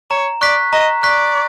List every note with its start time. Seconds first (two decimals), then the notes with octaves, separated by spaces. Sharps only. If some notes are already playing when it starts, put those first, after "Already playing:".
0.10 C#5 A#5
0.41 D5 C#6 F#6 B6
0.73 D#5 A#5
1.03 D5 C#6 F#6 B6